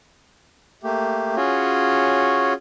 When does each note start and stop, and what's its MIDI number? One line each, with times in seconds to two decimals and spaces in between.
0.83 1.36 57
0.83 1.36 58
0.83 1.36 67
1.36 2.53 61
1.36 2.53 65
1.36 2.53 66
1.36 2.53 68
1.36 2.53 73